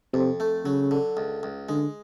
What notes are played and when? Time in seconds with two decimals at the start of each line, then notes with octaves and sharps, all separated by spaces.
0.13 F2 C3
0.40 A3
0.65 C#3 F#3
0.91 D3
1.17 C#2
1.43 C#2
1.69 D3 G#3